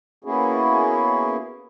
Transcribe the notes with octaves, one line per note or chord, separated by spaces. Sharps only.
A#3 B3 C#4 E4 F#4 G#4